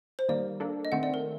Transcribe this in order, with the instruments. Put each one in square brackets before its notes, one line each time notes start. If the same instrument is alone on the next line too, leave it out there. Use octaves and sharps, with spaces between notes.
[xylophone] C5
[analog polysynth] D#3 G3 A#3 [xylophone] D5
[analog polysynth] A#3 D4 A4
[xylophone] D#5
[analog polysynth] D#3 A3 C4 [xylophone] F#5
[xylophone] D5
A#4